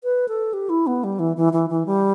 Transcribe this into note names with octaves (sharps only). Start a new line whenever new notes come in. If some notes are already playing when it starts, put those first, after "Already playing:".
B4
A4
G4
E4
B3
G3
E3
E3
E3
E3
G3